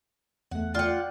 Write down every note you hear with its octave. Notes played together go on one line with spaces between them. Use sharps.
E2 A3 F#5
F4 D5 F#5 G5